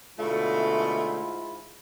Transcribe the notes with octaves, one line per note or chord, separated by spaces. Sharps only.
G#2 B2 D3 A3 E4 F4